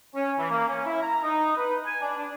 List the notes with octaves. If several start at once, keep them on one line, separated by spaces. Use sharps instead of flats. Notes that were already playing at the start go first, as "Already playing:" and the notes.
C#4
E3
A#3
C#4
E4
A#5
D#4
B4
G#5
D4
D4